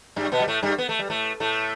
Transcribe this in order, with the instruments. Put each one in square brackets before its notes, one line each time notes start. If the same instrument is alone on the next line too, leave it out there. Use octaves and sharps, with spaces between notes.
[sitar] G2 G3
B2 B3
G3
A2 A3
G2 G3
B3
A3
G3
A2 A3
A2 A3